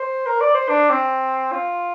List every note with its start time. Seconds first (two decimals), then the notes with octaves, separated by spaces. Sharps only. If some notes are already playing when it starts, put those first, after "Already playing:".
Already playing: C5
0.26 A#4
0.41 D5
0.54 C5
0.69 D4
0.90 C4
1.52 F4